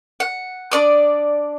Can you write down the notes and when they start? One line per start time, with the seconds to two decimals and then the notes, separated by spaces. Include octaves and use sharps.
0.20 F#5
0.72 D4 D5 D#6